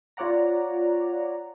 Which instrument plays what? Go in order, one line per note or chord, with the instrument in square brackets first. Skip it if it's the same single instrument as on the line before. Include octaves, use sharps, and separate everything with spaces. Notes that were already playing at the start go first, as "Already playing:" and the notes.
[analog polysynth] F4 C#5 D5 F#5 A#5